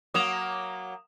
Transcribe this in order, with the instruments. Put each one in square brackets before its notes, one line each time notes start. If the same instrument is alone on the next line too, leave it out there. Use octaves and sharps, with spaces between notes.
[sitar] F#3 A#3 [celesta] D#6 E7 F7